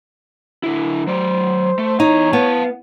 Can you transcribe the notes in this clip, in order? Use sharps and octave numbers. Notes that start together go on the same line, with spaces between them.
D3 E4
F#3 C5 D5
A3
E2 D#4 C#5 A#5
B3 F5 A5